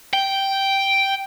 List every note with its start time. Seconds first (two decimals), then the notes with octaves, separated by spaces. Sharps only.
0.13 G5